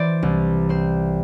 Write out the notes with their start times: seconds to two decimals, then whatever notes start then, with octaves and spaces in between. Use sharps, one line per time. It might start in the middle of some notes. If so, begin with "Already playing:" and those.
Already playing: E3 C5 D5
0.23 C2
0.69 C4 C5